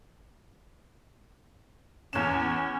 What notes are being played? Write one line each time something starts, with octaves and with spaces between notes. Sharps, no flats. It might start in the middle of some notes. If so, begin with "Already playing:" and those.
E2 C#4 E7